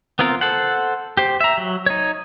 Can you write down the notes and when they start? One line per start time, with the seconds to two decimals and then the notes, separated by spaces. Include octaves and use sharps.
0.19 B3 C4 F4 A#4
0.41 A4 C5 F#5
1.17 G4 C5
1.40 E5 A#5
1.58 F#3
1.86 D#4 C#5